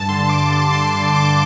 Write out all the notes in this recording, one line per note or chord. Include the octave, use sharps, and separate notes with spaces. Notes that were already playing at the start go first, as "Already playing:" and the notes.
Already playing: G2 A5
D3 C6
D6
D3
C6
G2
D6